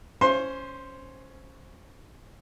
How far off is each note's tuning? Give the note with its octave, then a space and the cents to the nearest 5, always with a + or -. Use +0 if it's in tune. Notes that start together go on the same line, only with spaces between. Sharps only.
C#4 +0 C5 +0 C6 +25